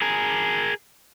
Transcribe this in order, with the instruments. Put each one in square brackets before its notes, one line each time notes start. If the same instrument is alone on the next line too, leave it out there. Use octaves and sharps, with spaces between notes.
[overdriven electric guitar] G#4 A#4